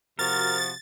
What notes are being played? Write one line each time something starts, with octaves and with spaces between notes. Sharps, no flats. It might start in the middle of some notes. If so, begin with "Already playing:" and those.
C3 F3 F#4 A#4 A6